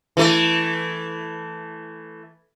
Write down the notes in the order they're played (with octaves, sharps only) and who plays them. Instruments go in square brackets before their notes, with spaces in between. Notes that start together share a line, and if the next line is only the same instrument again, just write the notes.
[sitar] E3 A3